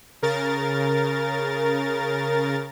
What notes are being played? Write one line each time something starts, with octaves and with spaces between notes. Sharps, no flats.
C#3 A#4 A6